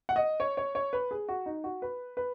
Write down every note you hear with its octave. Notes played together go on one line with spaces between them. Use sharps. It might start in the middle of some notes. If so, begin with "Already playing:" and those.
F#5
D#5
C#5
C#5
C#5
B4
G#4
F#4
D#4
F#4
B4
B4